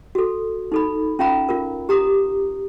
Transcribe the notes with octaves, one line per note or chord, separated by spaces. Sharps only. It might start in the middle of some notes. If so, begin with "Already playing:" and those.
F#4 A4
D#4 A4 B5
C#4 F4 F5 A#5 B5
F4 A#4
G4 A#5 D#6